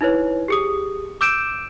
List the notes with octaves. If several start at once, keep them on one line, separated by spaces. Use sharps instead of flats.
D#4 E4 B4 C#5
G4 G#4 D#6
D6 E6 G6 D7 E7